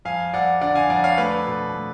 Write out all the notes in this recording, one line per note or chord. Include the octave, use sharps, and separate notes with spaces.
F2 F5 G#5
F2 D5 F#5
D3 D5 F#5
F5 G#5
F2 D5 F#5
C#5 F5
A3 B4 D5
B2
A3